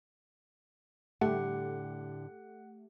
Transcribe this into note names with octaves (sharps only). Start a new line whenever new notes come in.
A2 D3 G3 A3 G4 F#5